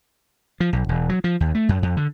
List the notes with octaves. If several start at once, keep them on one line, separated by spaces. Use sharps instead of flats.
F3
B1
E1
F#3
F3
D#2
A3
F#2
F2
D3